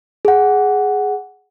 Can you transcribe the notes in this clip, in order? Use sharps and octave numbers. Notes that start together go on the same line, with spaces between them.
G#4 F#5